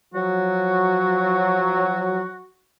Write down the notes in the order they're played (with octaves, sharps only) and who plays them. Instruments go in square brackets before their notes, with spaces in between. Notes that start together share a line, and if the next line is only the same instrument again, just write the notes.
[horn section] F3 F#3 [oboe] F#4